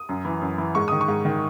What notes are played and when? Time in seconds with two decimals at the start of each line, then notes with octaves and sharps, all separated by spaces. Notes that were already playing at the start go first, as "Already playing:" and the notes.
Already playing: D#6
0.09 F#2
0.25 E3
0.41 F#2
0.58 E3
0.75 G#2 C#6
0.88 D#3 D#6
1.01 C#6
1.08 G#2
1.25 D#3